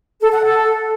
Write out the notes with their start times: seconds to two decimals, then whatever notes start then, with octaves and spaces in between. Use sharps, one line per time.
0.21 A4
0.32 F#5
0.44 A4